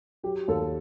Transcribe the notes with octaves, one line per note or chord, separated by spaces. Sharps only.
F#3 G4
D#2 A4